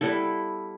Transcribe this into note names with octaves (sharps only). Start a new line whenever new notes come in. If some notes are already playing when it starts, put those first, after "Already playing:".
G3 B3 E4 A4